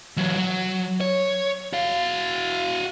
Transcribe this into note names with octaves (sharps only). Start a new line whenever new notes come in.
E3 F#3
F#3
C#5
F#4 F5